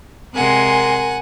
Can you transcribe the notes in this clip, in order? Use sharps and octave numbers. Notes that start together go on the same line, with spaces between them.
C3 G#3 A#4 F#5 G#5 C6